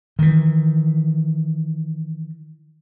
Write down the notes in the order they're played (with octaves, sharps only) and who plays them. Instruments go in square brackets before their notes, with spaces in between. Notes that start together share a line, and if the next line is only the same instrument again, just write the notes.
[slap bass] D#3 E3